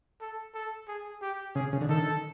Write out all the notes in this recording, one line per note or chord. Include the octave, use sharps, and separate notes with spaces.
A4
A4
G#4
G4
C#3 G#4
C#3
D3
D#3 A4